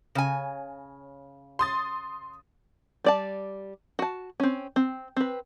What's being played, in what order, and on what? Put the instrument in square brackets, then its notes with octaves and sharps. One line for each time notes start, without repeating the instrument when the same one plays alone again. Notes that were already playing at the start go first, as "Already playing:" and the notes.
[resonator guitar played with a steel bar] C#3 G#5
[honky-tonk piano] C6 D#6 A6
[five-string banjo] G3 D5 A5
F#4 A5
C4 C#4
C4
C4 B4